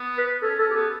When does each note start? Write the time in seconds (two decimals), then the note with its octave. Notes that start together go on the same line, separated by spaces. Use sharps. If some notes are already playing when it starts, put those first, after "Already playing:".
Already playing: B3
0.18 B4
0.42 C#4 A4
0.59 C#4 A4
0.71 G4
0.75 B3 A4